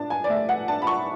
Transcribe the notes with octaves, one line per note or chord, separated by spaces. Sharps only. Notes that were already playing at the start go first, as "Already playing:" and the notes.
Already playing: D4 A5
G#5
D5
A3 E5
F#5
D4 A5
B5
C#6